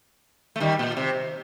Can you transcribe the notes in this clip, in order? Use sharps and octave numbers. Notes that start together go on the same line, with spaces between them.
A3
D#3 G3
A#2
C3